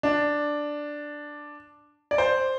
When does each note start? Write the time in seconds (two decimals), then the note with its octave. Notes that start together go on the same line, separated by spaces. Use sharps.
0.03 D4
2.11 D5
2.18 C5